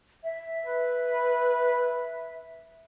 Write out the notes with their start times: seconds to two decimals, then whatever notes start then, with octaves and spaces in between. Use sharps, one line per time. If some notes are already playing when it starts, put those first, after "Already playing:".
0.24 E5
0.66 B4